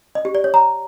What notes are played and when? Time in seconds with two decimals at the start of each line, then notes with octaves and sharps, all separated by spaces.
0.15 D#5
0.25 G4
0.35 D5
0.44 C#5
0.54 A#5